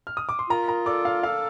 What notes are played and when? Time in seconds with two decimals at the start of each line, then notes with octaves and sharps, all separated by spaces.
0.07 F6
0.17 D#6
0.29 D6
0.39 C6
0.49 F4 A#4 A#5
0.68 A#4 A#5
0.86 A4 D5 D6
1.05 F5 F6
1.23 A4 F5 F6